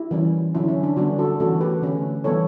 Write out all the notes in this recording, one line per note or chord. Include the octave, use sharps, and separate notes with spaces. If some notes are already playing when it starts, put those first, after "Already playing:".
Already playing: E4 G4
E3 G3 C#4
D3 F#3 C#4 E4
C#4
D4
D3 G3 B3 D4 F#4
F#4 A4
E3 A3 C#4 F#4 A4
G4 B4
D3 A3 C#4
E3 G3 B3 A4 C#5